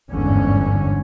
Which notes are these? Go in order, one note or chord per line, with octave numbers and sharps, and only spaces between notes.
G1 E2 G#2 D3 C#4